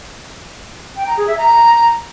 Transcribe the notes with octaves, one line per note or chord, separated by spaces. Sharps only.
G5
A#5
G#4
E5
A#5